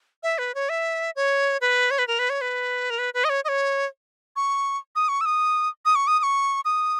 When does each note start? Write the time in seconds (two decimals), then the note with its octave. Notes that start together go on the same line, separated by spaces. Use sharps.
0.23 E5
0.38 B4
0.55 C#5
0.69 E5
1.16 C#5
1.61 B4
1.91 C#5
1.99 B4
2.08 A#4
2.19 B4
2.30 C#5
2.41 B4
2.90 A#4
2.99 B4
3.14 B4
3.24 D#5
3.29 C#5
3.45 D#5
3.48 C#5
4.36 C#6
4.96 D#6
5.09 C#6
5.21 E6
5.26 D#6
5.86 D#6
5.95 C#6
6.07 D#6
6.19 D#6
6.23 C#6
6.65 D#6